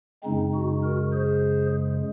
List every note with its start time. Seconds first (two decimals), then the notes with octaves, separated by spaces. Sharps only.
0.24 F#2 C#3 G#3 C4 D#4
0.54 D#4 F#4
0.83 F#4 A#4
1.13 G#4 C5